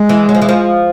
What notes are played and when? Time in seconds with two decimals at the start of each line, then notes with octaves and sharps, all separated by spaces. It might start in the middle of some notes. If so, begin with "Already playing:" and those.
Already playing: G#3
0.09 E3
0.29 F#3
0.35 F3
0.42 E3
0.49 F3